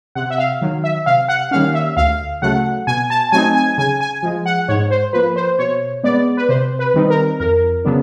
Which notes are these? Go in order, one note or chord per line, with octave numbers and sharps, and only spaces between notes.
C3 F#5
E5
F5
D#3 F#3
E5
C3 F5
F#5
D#3 G3 A#3 C#4 F5
E5
D2 F5
C#3 F#3 A3 F#5
B2 G#5
A5
F#3 A3 C4 D#4 G#5
G#5
C#3 G#5
G#5
F3 G#3
F#5
G#2 C#5
C5
F3 A#3 B4
C5
B2 C#5
G#3 B3 D5
B4
C3 C5
B4
D#3 G3 C4 D#4
A#4
F2 A#4
C#3 F#3 B3 D4